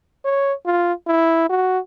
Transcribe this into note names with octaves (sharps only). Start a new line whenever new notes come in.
C#5
F4
E4
F#4